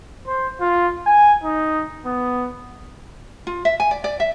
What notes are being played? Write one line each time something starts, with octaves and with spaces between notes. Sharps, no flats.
C5
F4
G#5
D#4
B3
F4
E5
G#5
D5
D5
E5